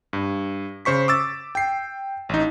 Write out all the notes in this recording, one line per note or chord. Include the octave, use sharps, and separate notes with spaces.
G2
C#3 C5 C#6 B6
D6 E6 A6
G5 C7
A1 D#4